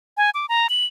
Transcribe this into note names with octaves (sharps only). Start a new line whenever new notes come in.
G#5
D6
A#5
F#7